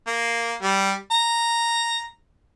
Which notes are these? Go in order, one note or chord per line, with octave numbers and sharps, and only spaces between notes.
A#3
G3
A#5